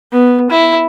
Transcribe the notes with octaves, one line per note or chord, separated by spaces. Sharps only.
B3
E4